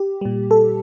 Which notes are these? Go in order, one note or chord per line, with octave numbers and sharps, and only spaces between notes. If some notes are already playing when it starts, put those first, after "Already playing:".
Already playing: G4
A#2 G3
A4